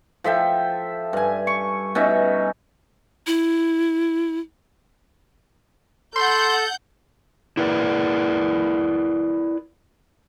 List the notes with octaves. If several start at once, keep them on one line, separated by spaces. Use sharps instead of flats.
F3 A4 E5 G5
G2 G#5
C#6
B2 C#4 D#4 E5
E4
A4 F#5 C6 G6
E4 A#4 B4 D5